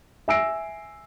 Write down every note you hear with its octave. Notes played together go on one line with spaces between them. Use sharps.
E5 G#5 E6 A#6 C7 D7